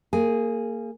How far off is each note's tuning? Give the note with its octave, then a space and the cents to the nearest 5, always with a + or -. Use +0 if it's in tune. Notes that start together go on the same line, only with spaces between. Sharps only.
A#3 -20 G#4 +0